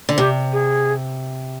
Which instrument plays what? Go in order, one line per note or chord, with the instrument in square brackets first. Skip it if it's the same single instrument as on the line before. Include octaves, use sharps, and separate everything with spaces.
[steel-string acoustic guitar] D3
[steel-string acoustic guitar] C3 [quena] G4
[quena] G#4